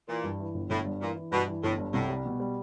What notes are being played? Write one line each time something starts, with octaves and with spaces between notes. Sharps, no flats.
A#2 E3
G2
E3
G1
G1 A2
G2
A#2 E3
E3
G2 B2
E3
G1 A2
G2
C2 A2
G3
B2
G3